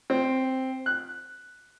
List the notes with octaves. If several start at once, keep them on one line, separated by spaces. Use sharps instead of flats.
C4
F#6